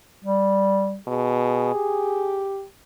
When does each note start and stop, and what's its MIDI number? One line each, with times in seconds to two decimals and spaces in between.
0.25 0.98 55
1.07 1.70 47
1.07 2.47 68
1.74 2.65 67